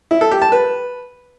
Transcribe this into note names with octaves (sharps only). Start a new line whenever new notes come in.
E4
A4
G4
A5
B4